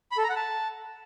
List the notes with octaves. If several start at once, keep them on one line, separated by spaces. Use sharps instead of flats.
B5
A4
A#5
F#5
A5